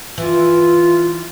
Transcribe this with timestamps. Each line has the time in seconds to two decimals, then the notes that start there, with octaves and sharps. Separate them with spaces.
0.18 E3 F4